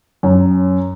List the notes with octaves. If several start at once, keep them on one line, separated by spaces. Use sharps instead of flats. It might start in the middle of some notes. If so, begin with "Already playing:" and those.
F#2